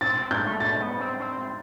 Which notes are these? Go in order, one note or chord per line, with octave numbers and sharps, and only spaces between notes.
C4 A6
C4
A3 G6
A3
A3 A6
B3
C4
C4